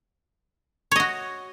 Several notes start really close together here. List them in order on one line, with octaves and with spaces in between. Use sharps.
C#5 D#5 F#4